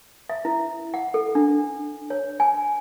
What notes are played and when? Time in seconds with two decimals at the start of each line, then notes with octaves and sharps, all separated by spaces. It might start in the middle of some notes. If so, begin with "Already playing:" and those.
0.29 E5
0.45 E4
0.94 F#5
1.14 A4
1.35 D4
2.10 C#5
2.40 G#5